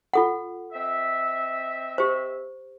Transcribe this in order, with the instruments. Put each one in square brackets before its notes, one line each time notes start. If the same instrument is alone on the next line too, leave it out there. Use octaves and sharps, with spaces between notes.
[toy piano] F4 A4 F#5
[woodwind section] C4 D#5 E5
[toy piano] G4 C5